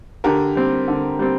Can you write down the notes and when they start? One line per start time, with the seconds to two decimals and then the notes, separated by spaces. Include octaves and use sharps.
0.24 D3 G4 A#4
0.55 G3 C4
0.88 D3
1.19 G3 C4